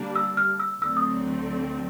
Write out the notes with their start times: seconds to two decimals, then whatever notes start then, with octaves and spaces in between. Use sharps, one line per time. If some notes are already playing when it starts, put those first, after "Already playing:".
Already playing: D3 G3 A#3 D4
0.15 E6
0.37 F6
0.60 E6
0.82 D2 D3 F#3 A3 C4 E6
0.97 D#6